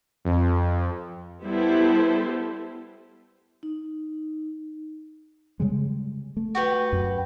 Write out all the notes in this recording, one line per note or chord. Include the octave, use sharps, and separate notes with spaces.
F2
G3 B3 E4 A4 C5
D#4
C#3 G3 G#3
A3
F#4 G4 B4
F#2